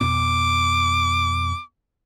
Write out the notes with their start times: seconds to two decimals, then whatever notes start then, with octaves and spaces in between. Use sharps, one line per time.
0.01 F2 B2 B3 D6